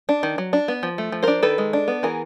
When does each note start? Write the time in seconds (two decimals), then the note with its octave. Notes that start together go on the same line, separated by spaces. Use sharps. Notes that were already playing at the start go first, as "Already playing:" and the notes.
0.09 D4
0.23 D#3
0.38 F#3
0.53 D4
0.68 B3
0.83 F3
0.98 A3
1.12 F3
1.23 D4 A#4 C5
1.43 D#3 A4 B4
1.58 G#3
1.73 D4
1.88 B3
2.03 E3 G#4 A#4